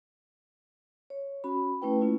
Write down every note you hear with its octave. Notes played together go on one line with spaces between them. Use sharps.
C#5
C#4 F#4 B5
A3 C#4 E4 B4 G5
A#3 C#4 E4 F4